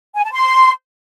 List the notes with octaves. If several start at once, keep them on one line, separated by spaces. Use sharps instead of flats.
G#5
A5
C6